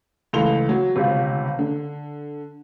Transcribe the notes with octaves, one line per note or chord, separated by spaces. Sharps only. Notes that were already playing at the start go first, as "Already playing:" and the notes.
C#2 E3 A3 C6 F7 G7
F#3
G1 C#2 C3 F4
D3